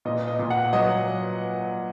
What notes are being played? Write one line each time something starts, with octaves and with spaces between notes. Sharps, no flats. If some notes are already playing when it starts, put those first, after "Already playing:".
A#2 D#5
D#5
A#2
F#5
F#3 D#5